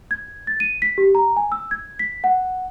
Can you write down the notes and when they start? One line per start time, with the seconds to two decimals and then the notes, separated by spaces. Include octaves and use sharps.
0.11 G#6
0.47 A6
0.60 D#7
0.82 B6
0.98 G4
1.15 A#5
1.37 G#5
1.52 E6
1.71 G#6
1.99 B6
2.24 F#5